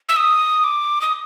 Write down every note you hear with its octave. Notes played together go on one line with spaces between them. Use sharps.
E6
D#6
D6
D#6